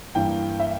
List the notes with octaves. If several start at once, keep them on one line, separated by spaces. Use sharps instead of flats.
G2 E3 A#3 G5
E5